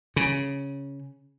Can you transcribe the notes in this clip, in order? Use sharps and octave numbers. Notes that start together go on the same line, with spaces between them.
C#3